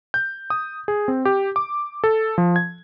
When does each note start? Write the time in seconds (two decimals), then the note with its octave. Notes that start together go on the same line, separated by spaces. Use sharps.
0.14 G6
0.50 D#6
0.88 G#4
1.08 C4
1.25 G4
1.56 D6
2.04 A4
2.38 F3
2.56 G#6